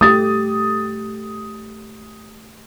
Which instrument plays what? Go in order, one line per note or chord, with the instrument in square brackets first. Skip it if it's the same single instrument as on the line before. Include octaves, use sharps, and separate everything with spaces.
[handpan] A3 G4 [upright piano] D#6 A6